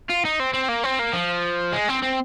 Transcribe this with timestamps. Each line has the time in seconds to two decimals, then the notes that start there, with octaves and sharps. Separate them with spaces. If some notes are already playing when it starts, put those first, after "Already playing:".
0.09 F4
0.25 D#4
0.40 C4
0.54 C4
0.69 A#3
0.84 C4
0.99 A#3
1.13 F3
1.73 G#3
1.89 C4
2.03 C4